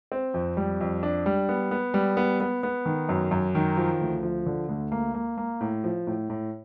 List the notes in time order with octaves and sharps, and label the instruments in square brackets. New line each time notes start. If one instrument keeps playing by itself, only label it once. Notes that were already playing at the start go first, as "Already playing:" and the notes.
[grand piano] C4
F2
G3
F2
D4
G3
B3
B3
G3
B3
B3
B3
D#3
F#2
F#2
D#3
F3
D2
F3
D3
D2
A#3
A#3
A#3
A2
F3
A2
A2